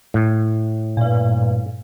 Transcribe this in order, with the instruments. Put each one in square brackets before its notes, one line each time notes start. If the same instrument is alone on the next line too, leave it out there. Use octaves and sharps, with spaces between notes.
[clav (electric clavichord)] A2
[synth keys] G2 A#2